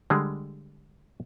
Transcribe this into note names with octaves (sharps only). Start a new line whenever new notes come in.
D3 G3 G#3